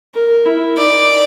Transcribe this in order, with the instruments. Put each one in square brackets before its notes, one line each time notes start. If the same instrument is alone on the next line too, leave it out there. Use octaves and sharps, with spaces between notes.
[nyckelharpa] A#4
E4
[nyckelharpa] D#4 [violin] D5